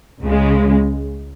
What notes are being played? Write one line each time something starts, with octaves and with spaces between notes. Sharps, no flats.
C#2 C#3 G#3